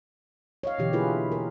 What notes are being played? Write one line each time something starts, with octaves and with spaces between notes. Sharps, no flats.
C#5 D#5 F5
B2 D3 E3 G4
A#3 E4 F4 G#4 A#4 B4
A#4